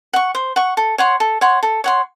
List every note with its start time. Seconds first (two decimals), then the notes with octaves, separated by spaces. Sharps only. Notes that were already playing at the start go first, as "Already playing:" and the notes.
0.13 F#5 C#6
0.35 C5
0.56 F#5 C#6
0.77 A4
0.98 C#5 F#5 C6
1.20 A4
1.41 C#5 F#5 C6
1.63 A4
1.84 C#5 F#5 C6